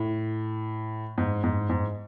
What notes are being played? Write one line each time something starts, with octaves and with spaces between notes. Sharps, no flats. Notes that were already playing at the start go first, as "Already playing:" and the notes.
Already playing: A2
G#2
G#2
G#2